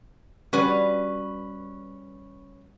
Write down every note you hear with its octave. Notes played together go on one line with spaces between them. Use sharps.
G3 C#4 F#4 B4